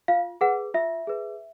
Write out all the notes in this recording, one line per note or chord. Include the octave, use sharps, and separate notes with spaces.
F4 F5
G#4 B4 F#5
F4 E5
G#4 B4